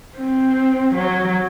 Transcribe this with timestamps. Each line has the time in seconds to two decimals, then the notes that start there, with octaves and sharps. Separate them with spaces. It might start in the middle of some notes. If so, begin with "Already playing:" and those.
0.18 C4
0.95 F#3